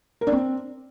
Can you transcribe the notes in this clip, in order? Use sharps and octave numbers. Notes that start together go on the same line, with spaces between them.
A#4
D4
C4